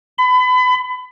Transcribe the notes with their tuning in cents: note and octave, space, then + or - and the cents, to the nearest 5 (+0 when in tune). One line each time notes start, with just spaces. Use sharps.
B5 +30